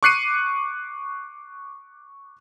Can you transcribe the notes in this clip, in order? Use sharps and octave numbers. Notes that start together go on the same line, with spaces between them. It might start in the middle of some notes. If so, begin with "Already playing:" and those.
C#6 D6 F#6 C7 C#7 D#7